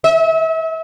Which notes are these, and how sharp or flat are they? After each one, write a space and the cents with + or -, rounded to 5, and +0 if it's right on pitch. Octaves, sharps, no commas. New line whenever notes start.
E5 -35